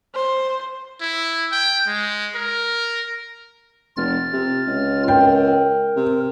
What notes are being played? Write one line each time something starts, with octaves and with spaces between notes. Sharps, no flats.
C5
E4
G5
G#3
A#4
F1 F4 F6 A6
C3
C#2
A#4 G5
C3